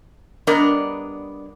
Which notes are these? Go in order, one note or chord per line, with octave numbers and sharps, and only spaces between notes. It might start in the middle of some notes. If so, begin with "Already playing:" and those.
G3 B3 D4 A#4 D5 D#5